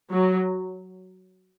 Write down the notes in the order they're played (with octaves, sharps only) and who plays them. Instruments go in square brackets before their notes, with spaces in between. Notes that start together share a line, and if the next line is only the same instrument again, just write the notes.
[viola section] F#3